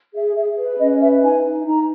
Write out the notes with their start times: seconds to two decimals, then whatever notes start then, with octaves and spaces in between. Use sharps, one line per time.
0.15 G#4 E5
0.36 G#4 E5
0.58 B4
0.79 C#4 D#5
1.01 B4 E5
1.22 D#4 G#5
1.45 D#4
1.66 D#4 A#5